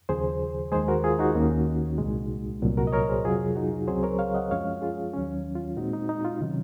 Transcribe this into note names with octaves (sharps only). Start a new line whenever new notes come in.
D#2 C#3 F3 G#4 C5
D#2 D#3 G#3 G#4 C5
F#4 A#4
F4 G#4
D#4 F#4
D#2 D#3 A#3 C#4
C2 A#2 G#3
C2 A#2 F#3
F#4 A#4
D#5
A#4 C#5
G#4 C5
F2 C3 F#3 F4 G#4
D#4 F#4
C#2 C#3 F#3 C4 G#4 C5
A#4 C#5
C#5 F5
D#5 F#5
F#2 F3 G#3 C#4 C#5 F5
F4 G#4
D#2 D#3 F#3 C#4
F4
A#2 G#3 C4 D#4 F#4
D#4
D#4
F4
C3 D#3 F#3 C#4